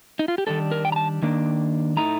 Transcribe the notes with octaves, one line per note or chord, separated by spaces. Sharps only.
D#4
F4
G4
D#3 G3 D4 A4
A#4
G5
A#5
A5
D#3 A#3 D4
A2 A3 D#4 A#5